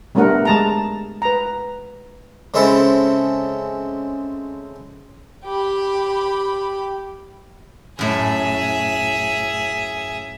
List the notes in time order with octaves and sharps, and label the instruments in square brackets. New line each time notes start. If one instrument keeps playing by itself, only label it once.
[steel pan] G3 A3 B3 D4 A#4 F#5
G#3 A5 A#5
B4 A#5
[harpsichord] C#3 G#3 C4 E4 A4
[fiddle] G4 B5
[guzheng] F#2 A2 [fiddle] G#4 E5